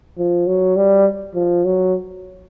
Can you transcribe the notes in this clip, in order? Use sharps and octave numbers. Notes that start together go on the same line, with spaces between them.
F3
F#3
G3
F3
F#3